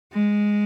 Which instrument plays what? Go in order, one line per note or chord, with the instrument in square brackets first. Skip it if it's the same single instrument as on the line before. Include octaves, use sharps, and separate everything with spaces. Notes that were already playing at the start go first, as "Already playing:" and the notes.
[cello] G#3